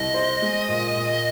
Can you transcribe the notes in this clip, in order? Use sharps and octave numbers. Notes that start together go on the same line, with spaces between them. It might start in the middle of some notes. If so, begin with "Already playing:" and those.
Already playing: C2 D#5
C5
G#3
A#2
A#2